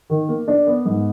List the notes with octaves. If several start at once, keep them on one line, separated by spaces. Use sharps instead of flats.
D#3
A#3
D4
B3
G#2